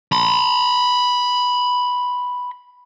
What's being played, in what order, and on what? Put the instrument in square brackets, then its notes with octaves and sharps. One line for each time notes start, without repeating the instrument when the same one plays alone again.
[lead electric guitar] B5 C6